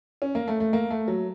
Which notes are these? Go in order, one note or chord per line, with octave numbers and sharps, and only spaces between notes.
C#4
A#3
A3
A3
A#3
A3
F#3